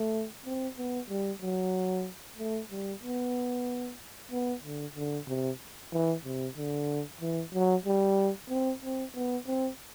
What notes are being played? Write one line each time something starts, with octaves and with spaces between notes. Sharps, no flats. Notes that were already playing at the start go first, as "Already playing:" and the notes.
Already playing: A3
C4
B3
G3
F#3
A3
G3
B3
B3
D3
D3
C3
E3
C3
D3
E3
F#3
G3
C4
C4
B3
C4